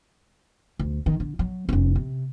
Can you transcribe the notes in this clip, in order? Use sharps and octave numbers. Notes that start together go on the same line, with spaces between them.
D2
D#3
D3
F#3
F1 C#4
C3